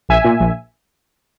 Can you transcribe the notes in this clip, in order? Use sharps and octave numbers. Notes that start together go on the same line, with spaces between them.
A#1 E5 G#5
A#2
A#1